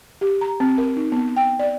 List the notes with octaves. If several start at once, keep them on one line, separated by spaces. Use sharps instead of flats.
G4
A#5
C4
A#4
D#4
B3
G5
D5